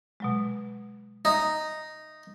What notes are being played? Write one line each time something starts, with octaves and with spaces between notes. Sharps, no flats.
B2 F#3 G#3
D#4 E5